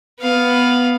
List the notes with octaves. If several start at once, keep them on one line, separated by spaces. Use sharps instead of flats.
B3 F5